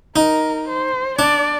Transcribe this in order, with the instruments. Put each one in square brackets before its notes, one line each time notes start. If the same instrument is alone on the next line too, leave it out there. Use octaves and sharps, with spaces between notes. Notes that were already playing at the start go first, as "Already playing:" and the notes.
[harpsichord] D#4 [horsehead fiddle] A#4
[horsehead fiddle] C5
[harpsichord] D4 [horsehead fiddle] D5